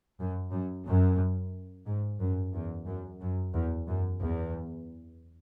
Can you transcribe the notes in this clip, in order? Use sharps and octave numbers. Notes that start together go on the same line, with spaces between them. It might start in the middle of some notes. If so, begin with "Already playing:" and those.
F#2
F#2
F#2
G#2
F#2
E2
F#2
F#2
E2
F#2
E2